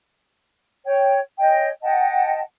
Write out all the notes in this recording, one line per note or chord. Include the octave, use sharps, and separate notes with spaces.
C#5 G5
C#5 D#5 G5 G#5
D#5 F#5 G5 A5